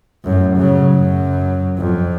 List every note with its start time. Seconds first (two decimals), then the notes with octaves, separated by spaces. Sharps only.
0.24 F#2 A2
0.57 C#3 F#3
0.93 F#2 F#3
1.78 F2